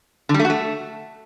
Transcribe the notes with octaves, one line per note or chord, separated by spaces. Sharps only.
D3
G3
A3
F#4
A3